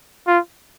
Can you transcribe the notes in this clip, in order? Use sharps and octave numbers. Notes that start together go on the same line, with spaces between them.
F4